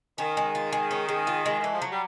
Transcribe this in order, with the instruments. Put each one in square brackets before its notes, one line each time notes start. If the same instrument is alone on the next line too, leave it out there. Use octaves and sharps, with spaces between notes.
[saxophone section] D#3 [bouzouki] C#4
[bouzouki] G#3
F4
G#3
C#4
G#3
F4
G#3
[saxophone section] D#3
[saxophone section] E3 [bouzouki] A3
[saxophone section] F3
[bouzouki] F#3
[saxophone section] G3